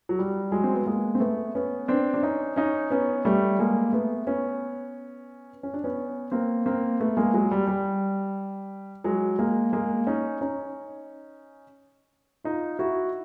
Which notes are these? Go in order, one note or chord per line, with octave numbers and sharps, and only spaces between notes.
F#3
G3
F#3 G#3
C4
B3
G#3 A#3
C4
A3 B3
B3 C#4
C4 D4
D4
C#4 D#4
C#4 D#4
B3 C#4
G3 A3
G#3 A#3
A3 B3
B3 C#4
C#4
D4
B3 C#4
A#3 C4
A#3 C4
A3 B3
G#3 A#3
F#3 G#3
G3
G3
F#3 G#3
G#3 A#3
G#3 A#3
C#4 D#4
C#4 D#4
D#4 F4
E4 F#4